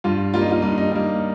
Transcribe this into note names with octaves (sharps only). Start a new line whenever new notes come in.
G2 F4
G3 A#3 F4
D#4
F4
G2 D#4
D#4
G3 A#3 D#4